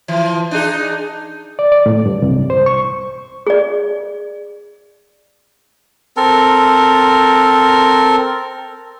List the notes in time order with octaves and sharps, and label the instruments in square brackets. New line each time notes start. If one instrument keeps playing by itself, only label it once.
[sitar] E3 F3
D4 D#4 G#4
[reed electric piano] D5
D5
A2
G2
C2
C5
C#6
[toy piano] G#4 D5
[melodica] C4 A4 A#4